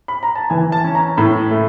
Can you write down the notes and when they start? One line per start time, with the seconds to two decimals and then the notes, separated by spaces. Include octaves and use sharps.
0.08 B5
0.23 A#5
0.35 A5
0.50 E3 G#5
0.72 A5
0.84 C#4
0.95 A#5
1.17 A2 B5
1.51 A3